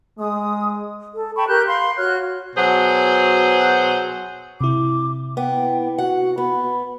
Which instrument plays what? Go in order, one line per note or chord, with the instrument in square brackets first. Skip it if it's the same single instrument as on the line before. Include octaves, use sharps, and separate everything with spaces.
[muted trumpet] G#3 [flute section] D#6
[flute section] A4
G5 A5 B5 C#6
G4 A#4 F#6 G6
F5 B5 C6
F#4 C#5 F6 F#6
[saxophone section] B2 F#3 G#4 C5 F#5
[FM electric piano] C3 E4 [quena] D6
[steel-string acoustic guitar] B3 [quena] G5
[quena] F#4 [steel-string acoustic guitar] F#5
[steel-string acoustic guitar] B3 [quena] B5